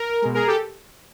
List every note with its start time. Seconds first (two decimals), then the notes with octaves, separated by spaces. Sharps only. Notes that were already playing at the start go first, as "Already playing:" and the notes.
Already playing: A#4
0.22 B2 G#3
0.34 G#4 A#4
0.47 G4 A4